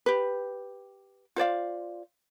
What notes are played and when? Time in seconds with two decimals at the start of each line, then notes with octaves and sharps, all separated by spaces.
0.06 G4 B4
1.36 F4 C5 D5 F5